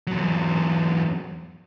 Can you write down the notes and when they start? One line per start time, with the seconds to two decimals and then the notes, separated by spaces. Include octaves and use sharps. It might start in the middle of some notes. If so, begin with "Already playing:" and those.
0.07 E2 F#3